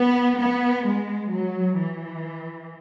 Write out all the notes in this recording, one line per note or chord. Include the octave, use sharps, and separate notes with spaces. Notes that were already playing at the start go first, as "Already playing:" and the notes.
Already playing: B3
B3
G#3
F#3
E3